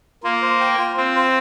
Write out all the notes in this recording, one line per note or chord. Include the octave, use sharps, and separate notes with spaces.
A#3 F4
C5
G5
F4
C4 F4
C5